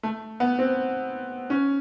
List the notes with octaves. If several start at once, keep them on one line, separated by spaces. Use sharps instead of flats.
A3
B3
C4
C#4